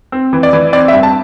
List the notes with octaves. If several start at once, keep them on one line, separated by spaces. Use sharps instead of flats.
C4
E3
D5
E3
C4 D5
E5
G2
A5